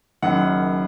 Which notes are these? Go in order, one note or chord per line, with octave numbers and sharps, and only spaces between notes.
F#1 F#2 D#3 F#5